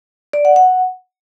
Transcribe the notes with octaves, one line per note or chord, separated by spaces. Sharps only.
D5
F#5
F#5